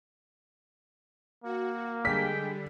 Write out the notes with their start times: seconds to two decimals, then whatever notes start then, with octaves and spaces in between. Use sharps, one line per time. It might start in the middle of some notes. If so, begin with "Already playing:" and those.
1.44 A#3 F#4
2.05 D3 G3 G#3 G#4 G5 B6